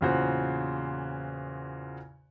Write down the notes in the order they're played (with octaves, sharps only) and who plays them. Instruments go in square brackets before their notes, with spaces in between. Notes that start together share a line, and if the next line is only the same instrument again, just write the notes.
[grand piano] E2 A#2 C#3 F#4 C5